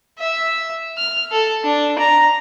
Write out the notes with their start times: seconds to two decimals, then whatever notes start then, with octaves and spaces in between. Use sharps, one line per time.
0.19 E5
0.97 F6
1.32 A4
1.64 D4
1.98 A#5